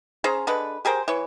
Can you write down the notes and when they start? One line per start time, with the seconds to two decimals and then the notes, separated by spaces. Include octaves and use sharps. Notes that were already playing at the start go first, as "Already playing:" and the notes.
0.24 C#4 G#4 C5 A#5
0.47 D3 G#3 B4
0.85 G4 G#4 A#4 C5
1.08 E3 C#5